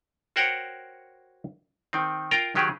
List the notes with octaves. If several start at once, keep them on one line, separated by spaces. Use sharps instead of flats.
F#4 A#4 C5 C#5 F#5 G5
D#3 C4
F4 A#4 F5 G5 A#5
D#3 F#3 G4 G#4